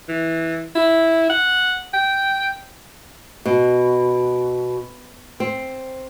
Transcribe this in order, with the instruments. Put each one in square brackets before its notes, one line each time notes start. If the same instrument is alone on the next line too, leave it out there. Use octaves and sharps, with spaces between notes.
[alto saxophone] E3
E4
F#5
G5
[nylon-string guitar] B2
C4